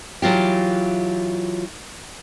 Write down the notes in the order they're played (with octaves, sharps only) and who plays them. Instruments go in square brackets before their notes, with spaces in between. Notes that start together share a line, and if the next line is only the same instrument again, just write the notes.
[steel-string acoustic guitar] E3 F#3 F4 G4